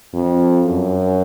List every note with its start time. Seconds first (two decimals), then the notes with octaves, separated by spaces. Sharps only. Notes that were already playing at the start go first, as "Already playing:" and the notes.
0.14 F2
0.66 F#2